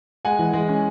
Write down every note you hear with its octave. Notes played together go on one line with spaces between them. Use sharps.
G#3 F#5 G#5
E3
G#3
C#4